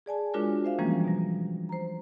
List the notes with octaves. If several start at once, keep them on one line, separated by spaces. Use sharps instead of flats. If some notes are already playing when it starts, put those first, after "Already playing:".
G#4 D5 G#5 A5
G#3 D4 F4 F#4 A#4 C#5
C5 E5 F5
E3 F3 G3 G#3 A#3 C#4
B2 G3
C5 A#5